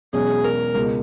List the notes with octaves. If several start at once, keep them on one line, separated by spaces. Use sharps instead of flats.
E1 E2 B2 F#3 C#4 G#4
A#4
C#2 B2 G#3